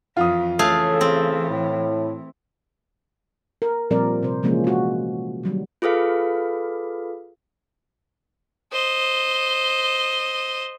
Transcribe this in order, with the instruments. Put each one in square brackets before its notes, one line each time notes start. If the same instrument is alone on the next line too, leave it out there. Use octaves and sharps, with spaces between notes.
[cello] F2 E3 [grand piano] F4 D#6
[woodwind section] C#3 A4 [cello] E3 [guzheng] A3 G#4 F5
[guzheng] C4
[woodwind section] A2
[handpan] A#4
A#2 F3 G3 C4 A#4 D5
C3 C5
C3 E3 F3 G#3 A#3 C#4
G#3 F#4
D#3 F#3 G3
[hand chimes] F4 G#4 A4 B4 F5
[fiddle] C5 D#5